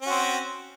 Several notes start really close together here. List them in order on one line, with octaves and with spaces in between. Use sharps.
C#4 F#4 C4